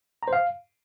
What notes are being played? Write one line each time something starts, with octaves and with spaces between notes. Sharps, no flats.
A#5
C5
F5